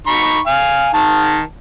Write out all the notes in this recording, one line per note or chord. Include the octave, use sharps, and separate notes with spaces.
D#4 B5 C#6
F5 G#5
D#3 A5